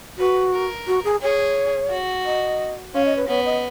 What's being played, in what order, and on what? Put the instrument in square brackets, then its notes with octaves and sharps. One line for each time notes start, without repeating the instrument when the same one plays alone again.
[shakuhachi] F#4 [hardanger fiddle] B4
[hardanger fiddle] A#4
[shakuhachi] F#4
G#4
[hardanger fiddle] G#4 [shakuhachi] C#5
[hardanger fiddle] F#4
[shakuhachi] D#5
[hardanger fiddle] C#4 [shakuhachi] F5
[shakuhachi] D#5
B4
[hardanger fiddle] B3 [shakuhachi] C#5
[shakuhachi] D#5